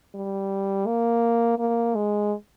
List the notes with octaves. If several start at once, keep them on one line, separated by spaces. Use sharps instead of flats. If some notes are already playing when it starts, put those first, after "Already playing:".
G3
A#3
A#3
G#3